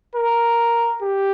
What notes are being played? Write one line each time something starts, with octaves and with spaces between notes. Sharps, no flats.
A#4
G4